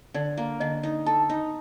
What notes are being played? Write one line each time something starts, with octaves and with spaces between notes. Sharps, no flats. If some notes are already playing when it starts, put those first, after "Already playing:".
D3 D5
A#3
D3 D#5
D#4
A4 A5
D#4